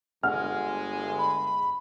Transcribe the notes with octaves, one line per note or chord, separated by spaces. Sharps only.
G1 G#3 F#5 F6
B5